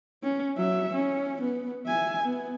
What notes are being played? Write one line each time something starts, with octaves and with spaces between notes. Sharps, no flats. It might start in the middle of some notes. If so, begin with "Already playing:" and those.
C#4
F#3 E5
C#4
B3
E5 G#5
B3